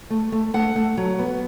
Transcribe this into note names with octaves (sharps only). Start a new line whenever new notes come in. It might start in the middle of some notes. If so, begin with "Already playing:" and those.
A3
A3
A3 F#5
A3
F#3
B3